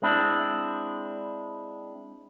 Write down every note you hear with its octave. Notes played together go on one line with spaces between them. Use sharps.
G#3 C4 D4 E4